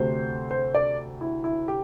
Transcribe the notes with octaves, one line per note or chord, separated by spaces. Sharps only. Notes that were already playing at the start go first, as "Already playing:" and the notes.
Already playing: D2 C3 A3 C5
C5
D5
E4
E4
G4